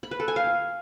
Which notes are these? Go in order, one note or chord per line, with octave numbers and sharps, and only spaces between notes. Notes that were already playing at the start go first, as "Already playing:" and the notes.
B5
B4
A4
G#5
F5